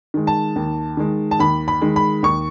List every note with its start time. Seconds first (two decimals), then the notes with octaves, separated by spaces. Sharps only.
0.14 D#3 G#3
0.27 A5
0.56 D#2
0.97 D#3 G#3
1.31 A5
1.39 D#2 B5
1.68 B5
1.82 D#3 G#3
1.96 B5
2.23 D#2 C#6